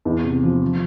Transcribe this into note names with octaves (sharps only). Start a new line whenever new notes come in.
E2
C3
F3
F3